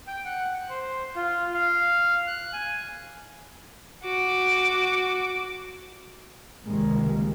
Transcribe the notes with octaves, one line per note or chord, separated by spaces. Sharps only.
G5
F#5
C5
F4
F5
F#6
G#5
F#4 D6
C#2 C3 D#3 G3 G#3 A#3